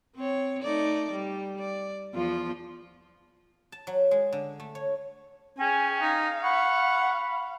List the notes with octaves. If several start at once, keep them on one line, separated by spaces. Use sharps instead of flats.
C4 C#5
A3 D#4 D5
G3
D5
E2 F3 F4
A5
F#3
G#3
D3
A3
C#5
C#4 G#4 G5 G#5
D#4 F5
F#5 B5 C#6